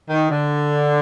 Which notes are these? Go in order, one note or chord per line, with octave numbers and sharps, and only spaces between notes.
D#3
D3